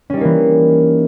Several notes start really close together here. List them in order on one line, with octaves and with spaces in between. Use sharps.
C#4 G3 D#4 A#3 E3